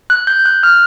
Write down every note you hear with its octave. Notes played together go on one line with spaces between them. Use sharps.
F#6
G6
F#6
F6